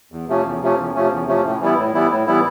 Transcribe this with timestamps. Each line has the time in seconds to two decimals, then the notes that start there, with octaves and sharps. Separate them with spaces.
0.12 E2
0.28 C3 F3 A3 C#4
0.45 E2
0.61 C3 F3 A3 C#4
0.78 E2
0.95 C3 F3 A3 C#4
1.11 E2
1.27 C3 F3 A3 C#4
1.44 A2
1.61 E3 G3 B3 E4
1.78 A2
1.94 E3 G3 B3 E4
2.10 A2
2.26 E3 G3 B3 E4